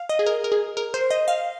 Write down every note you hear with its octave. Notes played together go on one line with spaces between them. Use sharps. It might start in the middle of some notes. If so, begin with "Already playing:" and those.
Already playing: F5
D#5
G#4
A#4
A#4
G#4
A#4
C5
D#5
F5